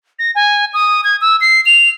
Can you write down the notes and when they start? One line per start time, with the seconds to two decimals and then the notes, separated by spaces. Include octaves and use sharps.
0.19 A#6
0.35 G#5
0.74 D#6
1.04 G#6
1.21 E6
1.41 C7
1.66 F7